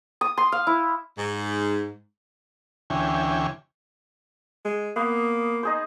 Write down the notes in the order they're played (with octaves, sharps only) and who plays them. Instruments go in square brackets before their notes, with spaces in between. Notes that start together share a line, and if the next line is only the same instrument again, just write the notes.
[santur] D#6
C6
F5
E4
[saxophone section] G#2
[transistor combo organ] D2 E3 C#4 G5 G#5
[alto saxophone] G#3
[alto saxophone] A#3 [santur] B3
[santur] D#4 G#4 C5